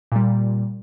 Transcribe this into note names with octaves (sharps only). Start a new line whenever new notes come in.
A#2 G3